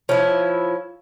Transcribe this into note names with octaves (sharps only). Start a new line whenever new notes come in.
F3 E4 C#5